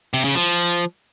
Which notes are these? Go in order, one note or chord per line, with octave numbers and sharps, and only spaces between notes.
C3
C#3
F3